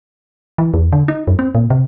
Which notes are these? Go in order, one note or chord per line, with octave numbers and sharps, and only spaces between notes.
E3
E2
D3
D#4
F#2
C4
A#2
C3